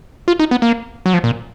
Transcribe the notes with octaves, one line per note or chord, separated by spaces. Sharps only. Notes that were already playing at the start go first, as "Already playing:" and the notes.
F4
D#4
B3
A#3
F#3
F3
A#2